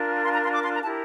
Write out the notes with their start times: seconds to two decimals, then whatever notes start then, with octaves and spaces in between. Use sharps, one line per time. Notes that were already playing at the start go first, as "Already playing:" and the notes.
Already playing: D4 F4 A#4
0.23 C6
0.32 A#5
0.43 C6
0.52 D6
0.63 C6
0.73 A#5
0.82 E4 G4 A#4 A5